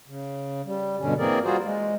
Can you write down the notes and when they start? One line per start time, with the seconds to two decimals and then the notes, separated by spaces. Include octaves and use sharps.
0.07 C#3
0.65 G3
1.00 G2 B2 D3 C#4
1.18 E3 A#3 C4 G#4 A#4 D5
1.44 G3 F4 F#4 G#4 C5
1.63 G#3